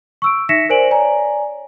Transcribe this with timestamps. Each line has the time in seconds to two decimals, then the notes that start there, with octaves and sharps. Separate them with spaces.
0.22 C#6 E6 D7
0.49 D#4 E5 A#6 B6 C#7 E7
0.69 A#4 C5 D5 G#5 D7 F#7
0.91 C#5 D5 G#5 A#5